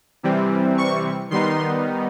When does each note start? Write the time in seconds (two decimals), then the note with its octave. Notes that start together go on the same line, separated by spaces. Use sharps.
0.23 C3 E3 G3 C4
0.78 C#6
1.30 D#3 G3 B3 D#4 C6